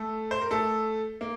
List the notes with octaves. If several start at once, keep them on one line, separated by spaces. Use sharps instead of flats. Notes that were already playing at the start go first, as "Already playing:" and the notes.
Already playing: A3 A4
C5
A#4
A3 A4
A#3